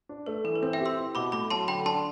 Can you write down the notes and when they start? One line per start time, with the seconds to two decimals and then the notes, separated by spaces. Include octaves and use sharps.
0.09 D4
0.26 A3 B4
0.44 E3 A4
0.55 B4
0.62 C4 A4
0.73 E5 G5
0.80 G4
0.85 C6 E6
0.98 E4
1.15 B2 B5 D6
1.32 A2 B5 D6
1.50 F#3 A5 C6
1.68 D3 G5 B5
1.85 D4 A5 C6